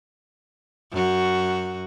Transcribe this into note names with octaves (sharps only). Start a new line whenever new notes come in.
F#2 F#4